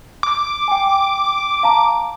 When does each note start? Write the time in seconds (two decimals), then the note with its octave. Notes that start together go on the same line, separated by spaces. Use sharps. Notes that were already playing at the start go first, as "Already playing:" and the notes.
0.23 D6
0.68 G5 G#5
1.63 F5 A5 A#5